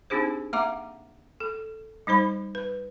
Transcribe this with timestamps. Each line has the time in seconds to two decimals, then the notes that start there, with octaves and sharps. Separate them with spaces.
0.10 C4 D4 D#4 G4 G#4 C5
0.53 A#3 E5 F#5 A#5 D6
1.40 A4
2.07 G3 D#4 C5 B5
2.55 B4